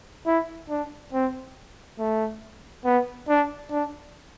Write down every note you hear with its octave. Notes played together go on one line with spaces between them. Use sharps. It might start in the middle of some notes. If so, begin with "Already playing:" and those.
E4
D4
C4
A3
B3
D4
D4